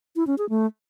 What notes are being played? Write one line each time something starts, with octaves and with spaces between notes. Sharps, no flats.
E4
C#4
G#4
A3